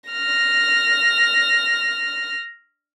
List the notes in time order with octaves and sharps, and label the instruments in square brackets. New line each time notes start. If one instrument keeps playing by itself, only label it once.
[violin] F6 A#6